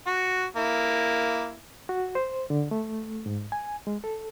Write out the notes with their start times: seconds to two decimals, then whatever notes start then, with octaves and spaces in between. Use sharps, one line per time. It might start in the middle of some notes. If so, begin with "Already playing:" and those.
0.07 F#4
0.56 A#3 E4
1.89 F#4
2.15 C5
2.50 D3
2.71 A3
3.26 G#2
3.52 G#5
3.87 G#3
4.04 A4